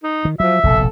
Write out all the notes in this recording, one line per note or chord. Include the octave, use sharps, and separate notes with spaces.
D#4
D#3
F3 F#3 E5
F1 A#1 B2 A4